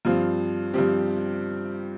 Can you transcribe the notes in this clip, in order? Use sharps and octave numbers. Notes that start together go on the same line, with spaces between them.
G2 F3 C4 F4
G2 F3 C4 G4